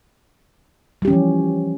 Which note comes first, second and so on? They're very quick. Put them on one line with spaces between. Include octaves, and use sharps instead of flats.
G3 G4 C#4 E3 F3